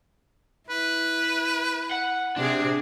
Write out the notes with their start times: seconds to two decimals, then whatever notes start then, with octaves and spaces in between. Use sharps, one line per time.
0.70 E4 B4
1.91 F#5
2.37 C3 C4 D4 G#4